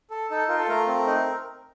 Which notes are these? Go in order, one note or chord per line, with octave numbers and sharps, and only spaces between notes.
A4
D#4 A4
F4 A#4
A4
A3 A#4
C4
D#4